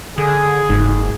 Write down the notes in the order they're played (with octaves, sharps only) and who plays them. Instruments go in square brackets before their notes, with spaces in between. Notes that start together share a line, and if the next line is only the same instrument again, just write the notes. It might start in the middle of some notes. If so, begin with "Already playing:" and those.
[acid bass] D3 [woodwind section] G#4
[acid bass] F#1 [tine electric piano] G#2